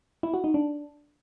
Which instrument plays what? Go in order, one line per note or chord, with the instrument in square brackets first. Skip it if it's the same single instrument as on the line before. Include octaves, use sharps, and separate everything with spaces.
[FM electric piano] E4
F#4
D#4
D4